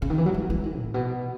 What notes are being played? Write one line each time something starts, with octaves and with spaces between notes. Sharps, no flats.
C#3
D#3
E3
F#3
G#3
D#3
E3
D#3
A2
B2